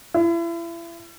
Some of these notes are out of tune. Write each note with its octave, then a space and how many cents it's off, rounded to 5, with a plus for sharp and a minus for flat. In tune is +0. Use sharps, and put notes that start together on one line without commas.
E4 +35